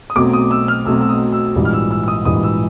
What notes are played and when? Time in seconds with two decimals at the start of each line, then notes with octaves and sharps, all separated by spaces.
0.10 D#6
0.15 B1 B2 F#3 A3 C4 D6
0.33 D#6
0.51 E6
0.68 F6
0.85 B1 B2 F#3 A3 C4 E6
1.01 E6
1.09 D#6
1.32 E6
1.55 A#1 G#2 E3 G3
1.65 F6
1.73 E6
1.91 E6
2.04 E6
2.08 D#6
2.25 A#1 G#2 E3 G3 D#6
2.43 E6